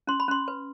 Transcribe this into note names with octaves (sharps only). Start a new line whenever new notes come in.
C#4 C6
B5
C#4 C6
B4